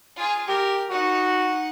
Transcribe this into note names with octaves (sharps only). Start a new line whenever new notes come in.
F4 G#4
G4 A#4
D#4 F#4 F#5